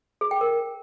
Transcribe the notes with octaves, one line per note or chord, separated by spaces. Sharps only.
G#4
G5
A#4